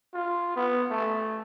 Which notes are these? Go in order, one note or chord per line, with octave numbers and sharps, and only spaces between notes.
F4
B3
A3